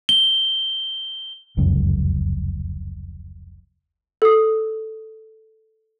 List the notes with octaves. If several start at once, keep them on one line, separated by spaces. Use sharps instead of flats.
G7
F1 C#2 F#2
A4 D#6